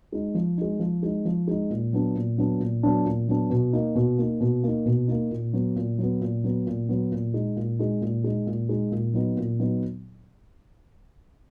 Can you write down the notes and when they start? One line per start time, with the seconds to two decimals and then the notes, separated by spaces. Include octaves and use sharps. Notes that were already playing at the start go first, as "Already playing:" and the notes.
0.12 G#3 D#4
0.34 F3
0.58 G#3 D#4
0.80 F3
1.03 G#3 D#4
1.25 F3
1.48 G#3 D#4
1.70 A#2
1.93 F#3 B3 D4
2.15 A#2
2.38 F#3 B3 D4
2.60 A#2
2.83 F#3 B3 D4
3.06 A#2
3.28 F#3 B3 D4
3.50 B2
3.73 A#3 D#4
3.95 B2
4.18 A#3 D#4
4.41 B2
4.63 A#3 D#4
4.86 B2
5.08 A#3 D#4
5.31 A#2
5.53 F#3 B3
5.76 A#2
5.98 F#3 B3
6.21 A#2
6.44 F#3 B3
6.66 A#2
6.89 F#3 B3
7.12 A#2
7.34 G#3 D#4
7.57 A#2
7.79 G#3 D#4
8.02 A#2
8.24 G#3 D#4
8.47 A#2
8.69 G#3 D#4
8.92 A#2
9.14 F#3 B3 D#4
9.37 A#2
9.59 F#3 B3 D#4